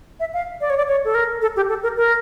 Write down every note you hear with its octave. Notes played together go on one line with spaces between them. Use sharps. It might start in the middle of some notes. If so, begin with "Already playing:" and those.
E5
F5
D5
C#5
D5
C#5
A4
A#4
A4
G4
A4
A#4
A#4